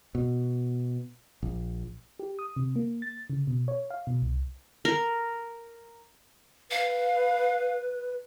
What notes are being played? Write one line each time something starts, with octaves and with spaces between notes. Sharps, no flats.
B2
A#1
G4
D#6
C3
A#3
A6
C#3
B2
C#5
F5
B2
C2
A#4
B4 F5